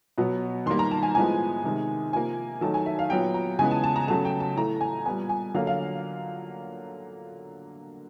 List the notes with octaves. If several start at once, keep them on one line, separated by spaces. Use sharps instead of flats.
B2 F#3 B3
D#3 G3 A#3 C6
A#5
A5
G#5
A2 F3 G#3 B3 G#5
C3 D#3 G#3
C3 F3 A#3 G#5
D#3 F#3 A3 A5
G#5
E5
F5
A#2 F#3 B3 G5
A#5
C#3 E3 G#3 B3 G#5
A5
A5
A#5
C#3 F#3 A3 A5
G5
A5
A2 E3 A3 A#5
G#5
A#2 G3 B3 G#5
G#5
D3 F#3 A#3 F5
F5